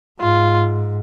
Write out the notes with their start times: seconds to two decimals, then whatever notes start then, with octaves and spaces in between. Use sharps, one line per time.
0.20 G#2 F4